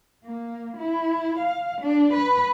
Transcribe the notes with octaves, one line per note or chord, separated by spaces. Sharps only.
A#3
E4
F5
D4
B4